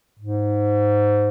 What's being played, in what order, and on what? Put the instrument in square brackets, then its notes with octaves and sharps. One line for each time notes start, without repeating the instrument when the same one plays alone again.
[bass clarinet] G#2